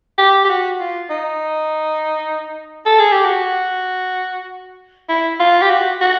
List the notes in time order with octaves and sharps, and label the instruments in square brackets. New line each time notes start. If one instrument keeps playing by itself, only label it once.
[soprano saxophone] G4
G4
F#4
F4
D#4
A4
G#4
G4
F#4
E4
F4
G4
F#4
F#4